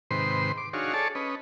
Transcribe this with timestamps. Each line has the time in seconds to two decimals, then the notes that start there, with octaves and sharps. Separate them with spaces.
0.11 G#2 C3 D#3 B4 C5 C6
0.58 D6
0.73 D4 D#4 F#4 G#4 C#5 F5
0.94 G#4 A4 C#5 D5 A5
1.15 C#4 B4 D#5